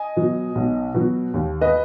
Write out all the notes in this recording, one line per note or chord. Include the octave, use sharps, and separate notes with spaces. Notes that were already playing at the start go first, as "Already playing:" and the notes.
Already playing: D#5 G#5
B2 F#3
B1
B2 F#3
D#2
B4 D#5